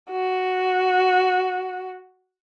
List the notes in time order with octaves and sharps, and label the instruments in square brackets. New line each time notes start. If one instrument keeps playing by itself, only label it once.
[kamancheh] F#4